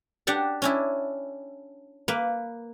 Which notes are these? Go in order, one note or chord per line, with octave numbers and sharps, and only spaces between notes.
D4 G4 F#5 A5
C#4 D4 E4
A#3 B4